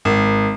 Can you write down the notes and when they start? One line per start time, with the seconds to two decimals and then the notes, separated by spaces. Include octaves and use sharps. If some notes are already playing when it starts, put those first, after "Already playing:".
0.05 G#1